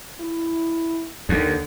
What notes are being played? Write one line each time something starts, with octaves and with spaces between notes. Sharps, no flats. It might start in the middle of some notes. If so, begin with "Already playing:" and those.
E4
D#2 D3